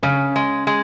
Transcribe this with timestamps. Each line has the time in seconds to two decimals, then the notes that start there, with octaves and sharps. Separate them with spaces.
0.03 C#3 C#4
0.36 G#3
0.67 G#3